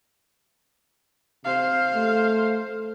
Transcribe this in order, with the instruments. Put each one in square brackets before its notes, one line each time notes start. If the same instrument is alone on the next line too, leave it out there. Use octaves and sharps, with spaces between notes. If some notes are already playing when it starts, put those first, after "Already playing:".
[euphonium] C3 [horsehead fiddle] C5 F5
[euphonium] A3